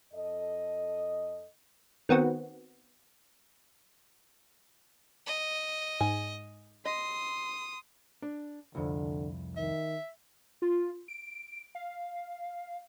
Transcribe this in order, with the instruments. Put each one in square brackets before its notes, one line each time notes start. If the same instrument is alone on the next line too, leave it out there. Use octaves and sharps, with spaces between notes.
[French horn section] F2 A4 D#5
[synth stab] D#3 B3 C4 F#4
[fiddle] D#5
[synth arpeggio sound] G#2 [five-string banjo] G#5
[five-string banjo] D#5 [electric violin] C6 [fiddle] D#6
[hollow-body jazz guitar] D4
[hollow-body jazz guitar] C2 F2 [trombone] D3
[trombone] D#3 [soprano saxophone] E5
[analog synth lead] F4
D7
F5